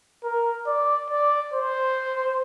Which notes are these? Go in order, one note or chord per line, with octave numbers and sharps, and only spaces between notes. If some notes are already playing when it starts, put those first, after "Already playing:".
A#4
D5
D5
C5